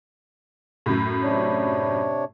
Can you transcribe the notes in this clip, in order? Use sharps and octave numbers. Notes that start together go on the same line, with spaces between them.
F#2 A2
C3 D4 C#5